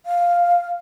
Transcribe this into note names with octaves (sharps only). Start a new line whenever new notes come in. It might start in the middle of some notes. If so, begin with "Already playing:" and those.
F5